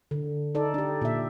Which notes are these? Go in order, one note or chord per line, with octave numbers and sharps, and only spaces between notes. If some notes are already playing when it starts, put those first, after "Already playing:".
D3
D#4 A4 D5
D4 G4
A#2 E5